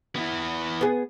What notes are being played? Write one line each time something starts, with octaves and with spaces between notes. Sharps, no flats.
B3 E4
B3 G#4